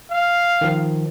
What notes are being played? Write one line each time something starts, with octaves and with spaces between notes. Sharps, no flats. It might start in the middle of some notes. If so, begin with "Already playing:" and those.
F5
D#3 F3